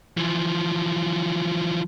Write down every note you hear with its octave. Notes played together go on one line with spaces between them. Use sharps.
E3 F3